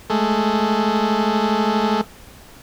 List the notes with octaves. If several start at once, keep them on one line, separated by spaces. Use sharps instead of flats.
G#3 A3